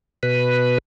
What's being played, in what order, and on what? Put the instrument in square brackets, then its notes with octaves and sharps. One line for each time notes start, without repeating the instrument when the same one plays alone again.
[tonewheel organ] B2 B4